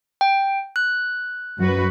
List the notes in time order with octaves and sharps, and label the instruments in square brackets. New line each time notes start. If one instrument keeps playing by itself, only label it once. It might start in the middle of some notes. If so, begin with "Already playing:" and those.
[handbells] G5
F#6
[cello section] F#2 F#4 B4